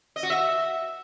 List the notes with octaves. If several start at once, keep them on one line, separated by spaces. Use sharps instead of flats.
D#5
F#4
E5